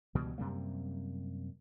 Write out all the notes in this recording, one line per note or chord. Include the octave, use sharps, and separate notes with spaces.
C#2 B2 E3 G3
F#2 C3 G3 A#3